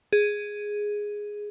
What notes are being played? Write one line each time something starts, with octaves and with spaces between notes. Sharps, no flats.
G#4